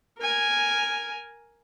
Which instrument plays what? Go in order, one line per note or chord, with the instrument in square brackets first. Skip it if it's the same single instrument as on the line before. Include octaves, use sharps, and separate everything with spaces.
[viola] A#4 G#5